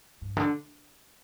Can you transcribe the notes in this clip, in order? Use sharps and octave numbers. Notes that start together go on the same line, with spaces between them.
G2
D3